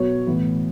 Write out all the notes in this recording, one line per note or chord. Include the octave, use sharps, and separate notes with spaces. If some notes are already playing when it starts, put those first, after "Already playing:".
Already playing: B2 F#3 B3 C#5
A2 E3 B3